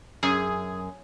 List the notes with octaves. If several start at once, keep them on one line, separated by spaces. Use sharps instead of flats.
F#2 G#4